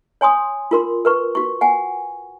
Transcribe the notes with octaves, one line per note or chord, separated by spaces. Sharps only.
C#5 G#5 C6 D#6
F4 A#4 C6
A#4 B4 C#6
F#4 C#6
F#5 G#5